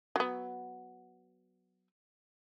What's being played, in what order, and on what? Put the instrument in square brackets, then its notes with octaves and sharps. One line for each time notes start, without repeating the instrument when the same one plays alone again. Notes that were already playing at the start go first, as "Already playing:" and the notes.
[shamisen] F#3 B3